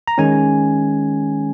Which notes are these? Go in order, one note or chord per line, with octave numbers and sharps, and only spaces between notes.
A#5
D#3 G#3 C#4 G#5